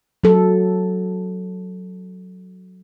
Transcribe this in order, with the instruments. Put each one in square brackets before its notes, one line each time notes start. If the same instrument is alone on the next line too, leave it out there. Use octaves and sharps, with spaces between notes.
[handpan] F#3 A4